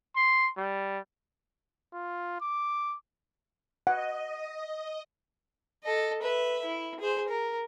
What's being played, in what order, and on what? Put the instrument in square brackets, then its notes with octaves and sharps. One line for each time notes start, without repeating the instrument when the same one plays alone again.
[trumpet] C6
G3
F4
D6
[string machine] D#5 [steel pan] F#5
[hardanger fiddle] A4 D#5
B4 E5
E4
G#4 C5
A#4